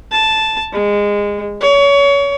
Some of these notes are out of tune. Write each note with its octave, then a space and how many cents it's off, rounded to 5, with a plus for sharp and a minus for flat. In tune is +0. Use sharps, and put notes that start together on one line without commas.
A5 -5
G#3 -20
C#5 +25